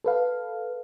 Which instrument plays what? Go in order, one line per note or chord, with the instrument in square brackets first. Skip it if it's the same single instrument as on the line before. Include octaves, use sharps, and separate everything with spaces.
[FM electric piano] A4 B4 F5